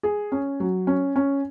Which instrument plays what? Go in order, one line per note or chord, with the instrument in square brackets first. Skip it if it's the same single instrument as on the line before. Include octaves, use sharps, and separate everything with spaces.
[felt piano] G#4
C#4
F#3
C#4
C#4